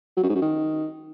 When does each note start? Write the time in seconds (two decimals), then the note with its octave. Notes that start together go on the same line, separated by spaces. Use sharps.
0.17 F#3
0.23 F#2
0.29 G#2
0.35 F#2
0.42 D#3